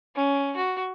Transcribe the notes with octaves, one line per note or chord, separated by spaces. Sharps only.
C#4
F#4